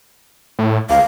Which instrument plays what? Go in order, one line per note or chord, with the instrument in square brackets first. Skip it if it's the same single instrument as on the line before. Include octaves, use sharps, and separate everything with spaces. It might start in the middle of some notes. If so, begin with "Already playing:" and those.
[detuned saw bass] A2
[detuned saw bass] C#2 [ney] F5